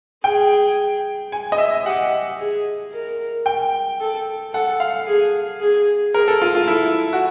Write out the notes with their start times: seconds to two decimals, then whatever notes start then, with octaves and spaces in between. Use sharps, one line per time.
0.24 G#4 G5
1.32 G#5
1.52 D#5
1.58 E5
1.86 G4 F#5
2.39 G#4
2.93 A#4
3.46 G5
4.00 A4
4.53 A4 F#5
4.80 F5
5.07 G#4
5.61 G#4
6.14 G#4 A#4
6.28 A4
6.42 F4
6.55 F4
6.68 E4 A4
7.13 F#4